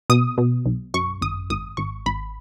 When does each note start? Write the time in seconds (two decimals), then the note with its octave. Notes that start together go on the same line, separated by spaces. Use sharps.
0.10 B2 D#6
0.38 B2
0.66 B1
0.94 F#2 C#6
1.22 G#1 D#6
1.50 G#1 D#6
1.77 G#1 C#6
2.06 G#1 B5